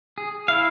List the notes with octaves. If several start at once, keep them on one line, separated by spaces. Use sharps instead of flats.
G#4
E4 F5